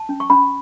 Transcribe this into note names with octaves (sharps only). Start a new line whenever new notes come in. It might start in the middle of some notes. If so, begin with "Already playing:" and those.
Already playing: A5
C#4
C#6
C#4 B5